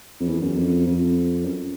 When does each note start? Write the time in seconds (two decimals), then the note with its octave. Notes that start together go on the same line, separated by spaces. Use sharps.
0.20 F2
0.27 E2
0.41 F#2
0.56 F2
0.87 F2
1.45 F#2